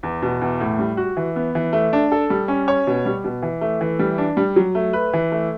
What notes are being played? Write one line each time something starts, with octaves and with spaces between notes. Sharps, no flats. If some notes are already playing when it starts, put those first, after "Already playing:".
E2
B2
E2
A2
G3
F#4
E3
B3
E3
A3
D4
A4
G3
C#4
C#5
B2
G3
B2
E3
A3
E3
G3
D4
G3
F#3
A3
B4
E3
A3